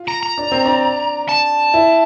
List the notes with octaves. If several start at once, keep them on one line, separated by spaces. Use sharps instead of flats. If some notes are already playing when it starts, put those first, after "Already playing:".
Already playing: F4
A#5
A#5
D4
C4
D4
A5
E4